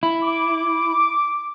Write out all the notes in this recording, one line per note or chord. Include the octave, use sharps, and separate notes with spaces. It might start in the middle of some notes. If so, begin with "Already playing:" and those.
E4
D6